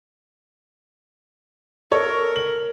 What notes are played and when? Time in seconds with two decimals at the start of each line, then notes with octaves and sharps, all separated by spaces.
1.92 A4 A#4 C#5
2.36 F#7